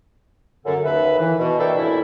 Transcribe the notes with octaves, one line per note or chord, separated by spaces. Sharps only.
F#2 D3
D#2 B4 E5
E3
B2
A#3 D4 E4 A4 E5 G5
F2 A2 E3 E4